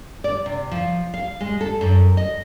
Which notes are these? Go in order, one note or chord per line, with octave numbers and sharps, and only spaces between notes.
D5
C3
F3
F5
G#3
A4
F#2
D#5